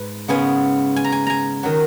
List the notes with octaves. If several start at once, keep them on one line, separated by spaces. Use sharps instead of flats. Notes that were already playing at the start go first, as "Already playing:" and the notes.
Already playing: G#2 B4
C#3 G#3 B3 G#5
G#5
A#5
G#5
G#5 A#5
D#3 F#3